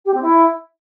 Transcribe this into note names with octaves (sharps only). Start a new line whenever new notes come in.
G4
C4
E4